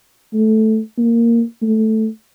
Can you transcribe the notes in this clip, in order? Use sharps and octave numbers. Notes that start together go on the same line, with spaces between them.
A3
A#3
A3